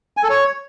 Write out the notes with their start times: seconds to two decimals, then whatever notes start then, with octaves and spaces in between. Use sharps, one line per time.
0.17 G#5
0.23 A4
0.30 C#5